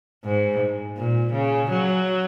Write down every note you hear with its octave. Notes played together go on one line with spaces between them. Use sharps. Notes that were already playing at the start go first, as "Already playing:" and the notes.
G#2
A#2
C#3
F#3